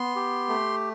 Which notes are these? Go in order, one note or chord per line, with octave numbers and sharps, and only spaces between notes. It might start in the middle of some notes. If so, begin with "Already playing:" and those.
Already playing: B3 C6
G4
A3